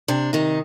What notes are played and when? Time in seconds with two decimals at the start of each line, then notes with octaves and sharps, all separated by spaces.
0.08 C3 D4
0.33 C3 D#3 D#4